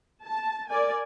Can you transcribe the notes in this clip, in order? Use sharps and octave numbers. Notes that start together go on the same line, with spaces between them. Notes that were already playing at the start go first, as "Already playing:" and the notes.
A5
A#4 D5 G#5